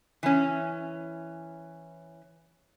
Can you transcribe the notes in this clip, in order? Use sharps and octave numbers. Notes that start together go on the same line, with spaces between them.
E3 C#4